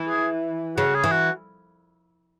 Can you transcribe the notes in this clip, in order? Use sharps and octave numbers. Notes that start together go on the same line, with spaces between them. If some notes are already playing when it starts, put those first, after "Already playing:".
Already playing: E3
G#4
C#3 F#4
G#4
E3
F#4